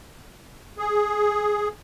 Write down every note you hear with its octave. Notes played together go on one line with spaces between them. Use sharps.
G#4